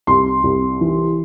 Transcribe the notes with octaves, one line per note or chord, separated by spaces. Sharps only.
C2 C6
C2
E3